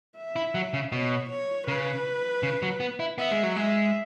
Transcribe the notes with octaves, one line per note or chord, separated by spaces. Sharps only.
E5
E4
F#3
C#3
B2 C#5
C#5
C#3 B4
C#3
F#3
B3
E4
B3 E5
G#3
F#3
G#3 E5